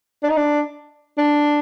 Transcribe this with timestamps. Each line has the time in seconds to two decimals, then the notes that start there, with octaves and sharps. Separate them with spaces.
0.23 D4
0.29 D#4
0.37 D4
1.18 D4